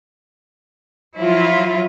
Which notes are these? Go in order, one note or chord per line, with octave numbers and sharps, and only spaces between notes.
F3 F#3 E4 F4